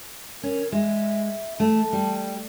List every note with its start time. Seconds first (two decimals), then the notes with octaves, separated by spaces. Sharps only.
0.43 C#4 A#4
0.72 G#3 E5
1.60 A3 A5
1.93 G3